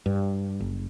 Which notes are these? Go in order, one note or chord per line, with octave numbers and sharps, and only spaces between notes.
G2
F#1